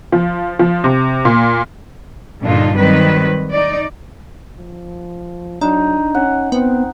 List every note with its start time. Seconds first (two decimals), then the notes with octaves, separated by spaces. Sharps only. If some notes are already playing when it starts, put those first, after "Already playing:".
0.12 F3
0.59 F3
0.84 C3
1.25 A#2
2.41 G2 A#2 D3 D4 D#4 F4
2.77 D#3 F#3 G3 C4 B4
3.51 D#4 D5
4.58 F3
5.61 F#3 D4 D#4
6.15 C#4 F#5
6.52 B3 C4